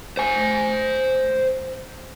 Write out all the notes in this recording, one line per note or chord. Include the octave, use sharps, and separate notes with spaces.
C5 G#5